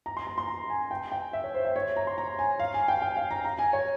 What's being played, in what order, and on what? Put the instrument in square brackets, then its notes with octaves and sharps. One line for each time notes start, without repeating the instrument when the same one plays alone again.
[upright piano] A#5
C6
A#5
C6
A#5
G#5
G5
G5
E5
C#5
C5
E5
C#5
A#5
C6
A#5
G#5
F5
G#5
G5
G5
F5
A#5
A#5
G#5
C#5